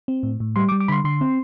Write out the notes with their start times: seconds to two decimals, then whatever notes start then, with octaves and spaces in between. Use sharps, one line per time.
0.08 C4
0.23 A2
0.40 A2
0.56 G3 C6
0.69 D6
0.72 G3
0.80 D6
0.88 D3 B5 C6
1.04 D3 C6
1.21 C4